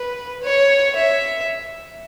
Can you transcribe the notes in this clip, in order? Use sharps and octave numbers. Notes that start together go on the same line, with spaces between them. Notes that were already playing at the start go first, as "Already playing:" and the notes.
Already playing: B4
C#5
E5